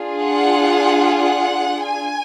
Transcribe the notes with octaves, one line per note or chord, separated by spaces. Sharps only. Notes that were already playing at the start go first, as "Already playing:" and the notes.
Already playing: D4 F4 G#4
F#5
F#5
G#5